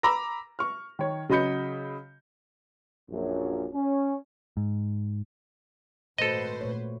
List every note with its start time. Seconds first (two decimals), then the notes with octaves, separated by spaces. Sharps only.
0.03 A#5 B5 D6 E6 A#6
0.59 C#6 F6
0.99 D#3 C#5
1.29 C#3 F#3 D#5 B5 G6 C#7
3.10 A#1 F#2
3.73 C#4
4.57 G#2
6.18 G#1 A#2 A3 F#4 A4 B4 C5 D#5
6.61 A#2 A3 C#5